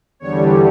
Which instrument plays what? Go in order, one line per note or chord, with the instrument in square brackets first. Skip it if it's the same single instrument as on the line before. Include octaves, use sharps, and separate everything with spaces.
[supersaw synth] E2 D3 G3 C#5